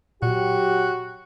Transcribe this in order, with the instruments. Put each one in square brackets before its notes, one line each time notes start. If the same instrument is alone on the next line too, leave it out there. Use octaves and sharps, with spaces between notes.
[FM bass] A#2 [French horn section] F#3 G4 [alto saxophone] F#4